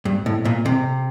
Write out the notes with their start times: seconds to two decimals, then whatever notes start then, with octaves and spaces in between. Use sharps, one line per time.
0.05 G2
0.26 A2
0.45 A#2
0.66 C3